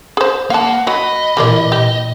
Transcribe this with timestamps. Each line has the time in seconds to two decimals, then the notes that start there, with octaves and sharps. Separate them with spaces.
0.17 G#4 C5
0.50 A#3 F5 F#5 A5
0.87 F#3 D#5 B5
1.37 A#2 E3 G3 A#3 D5
1.72 A#2 G4